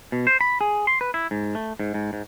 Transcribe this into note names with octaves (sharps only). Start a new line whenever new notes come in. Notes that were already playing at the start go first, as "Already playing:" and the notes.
B2
C5
B5
G#4
C6
B4
E4
G#2
A3
G#2
G#2
G#2